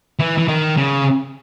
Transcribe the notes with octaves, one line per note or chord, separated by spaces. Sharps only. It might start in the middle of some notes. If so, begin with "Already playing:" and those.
E3
E3
D#3
C#3